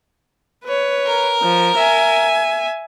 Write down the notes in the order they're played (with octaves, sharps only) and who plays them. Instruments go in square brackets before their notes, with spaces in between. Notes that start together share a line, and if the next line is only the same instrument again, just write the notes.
[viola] B4 C#5
[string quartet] A#4
[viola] F3
E5 G#5